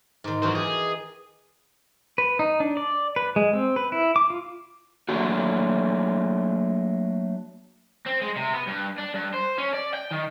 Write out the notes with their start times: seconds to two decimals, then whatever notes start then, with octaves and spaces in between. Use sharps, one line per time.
0.24 G#2 D#3
0.42 F#2 D#3 E3 F#4 C5
0.55 G4 G#4
2.18 B4
2.39 D#4
2.60 D4
2.77 D5
3.16 B4
3.36 G#3
3.53 C4
3.76 B4
3.92 E4
4.16 D6
4.30 F4
5.09 F#3 A3 A#3 D4 F#4
8.06 C4
8.22 G#3
8.36 C3
8.54 B3
8.68 G2
8.98 D4
9.15 G2
9.34 C5
9.58 C#4
9.74 D5
9.94 G5
10.11 D#3